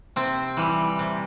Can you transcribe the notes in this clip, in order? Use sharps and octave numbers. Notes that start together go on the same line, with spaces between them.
C3 C4
E3 G3
C3